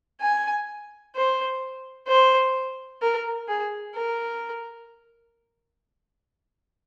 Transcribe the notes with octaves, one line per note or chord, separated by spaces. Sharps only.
G#5
C5
C5
A#4
G#4
A#4